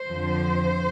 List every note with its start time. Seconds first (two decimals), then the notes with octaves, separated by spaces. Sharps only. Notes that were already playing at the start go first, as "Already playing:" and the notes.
Already playing: C5
0.10 F2 D3 F3